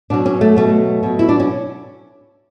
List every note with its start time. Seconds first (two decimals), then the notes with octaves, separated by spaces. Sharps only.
0.10 B2 F#3 D4
0.26 C#4
0.41 A3
0.56 B2 F#3 A3
1.03 B2 F#3
1.19 E4
1.29 D4
1.40 C#4